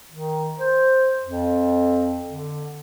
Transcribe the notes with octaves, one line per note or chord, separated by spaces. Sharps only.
D#3
C5
F2
D3